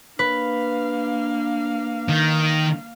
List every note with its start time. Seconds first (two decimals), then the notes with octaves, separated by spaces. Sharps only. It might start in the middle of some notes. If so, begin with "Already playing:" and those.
0.19 A#3 D4 B4 F5
2.09 D#3